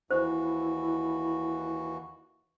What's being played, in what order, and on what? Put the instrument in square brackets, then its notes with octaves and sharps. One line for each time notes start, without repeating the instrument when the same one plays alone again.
[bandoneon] D#2 E3 F#4 [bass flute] E4 [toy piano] C5